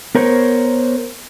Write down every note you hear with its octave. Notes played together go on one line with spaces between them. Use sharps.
B3 A#4 C5 C#5